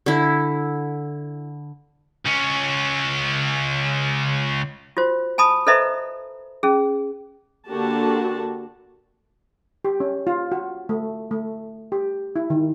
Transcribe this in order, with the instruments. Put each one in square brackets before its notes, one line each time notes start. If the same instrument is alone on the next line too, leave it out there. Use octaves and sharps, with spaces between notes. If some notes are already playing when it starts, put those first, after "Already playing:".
[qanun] D3 E4
[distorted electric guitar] C#2 C#4
[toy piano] F4 F#4 C5
G#5 A5 B5 D#6
A4 B4 C5 D#5 E5 A#5
C#4 G#4
[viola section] D3 A#3 F#4 G4 A5
[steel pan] G4
C#4
F4
F#4
A3
A3
G4
E4
D#3